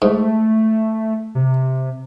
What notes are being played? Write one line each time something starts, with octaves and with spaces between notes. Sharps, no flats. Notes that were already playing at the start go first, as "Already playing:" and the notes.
G#2 A3
C3